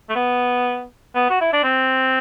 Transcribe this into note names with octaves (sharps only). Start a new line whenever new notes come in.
A3
B3
B3
F#4
E4
D4
C4